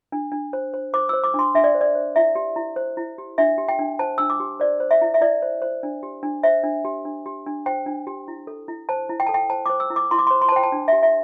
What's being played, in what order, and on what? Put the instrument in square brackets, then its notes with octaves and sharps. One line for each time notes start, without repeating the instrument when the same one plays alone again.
[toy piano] D4
D4
C5
C5
C5 D6
C5 E6
D6
D4 C6
D4 E5
D5
C5
D5
C5
E4 E5
G4
E4
C5
E4
G4
D4 E5
G4
G5
D4
C5 A5
D4 E6
D6
G4
C5 D5
C5
E5
E4
E5
E4 D5
C5
C5
D4
G4
D4
C5 E5
D4
G4
D4
G4
D4
C5 G5
D4
G4
E4
A4
E4
C5 A5
E4
G5
A4 A5
G5
C5 A5
C5 D6
E6
E4
D6
E4 C6
D6
C5 C6
C6
A5
C5 G5
A5
D4
G4 E5
E5